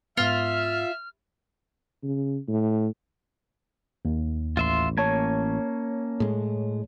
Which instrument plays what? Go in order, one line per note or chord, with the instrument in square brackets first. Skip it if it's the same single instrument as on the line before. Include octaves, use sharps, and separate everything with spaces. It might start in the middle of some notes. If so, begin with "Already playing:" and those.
[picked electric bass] G#2 B3 [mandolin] F4 [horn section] E5 [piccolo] F6
[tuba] C#3
A2
[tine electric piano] D#2
[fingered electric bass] A1 [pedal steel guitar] F4 E5 C6
[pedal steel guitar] A#3 C#4 [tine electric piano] C#5 A5 G#6
[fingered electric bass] A2 G#3